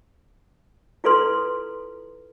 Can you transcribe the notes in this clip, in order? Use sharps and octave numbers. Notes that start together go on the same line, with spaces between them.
E4 F4 A4 B4 C6